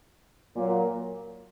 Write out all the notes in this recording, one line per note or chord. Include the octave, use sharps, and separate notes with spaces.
A#2 F#3 A#3